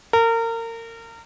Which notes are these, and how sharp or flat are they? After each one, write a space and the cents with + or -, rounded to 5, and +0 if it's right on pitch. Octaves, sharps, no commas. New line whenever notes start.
A#4 -30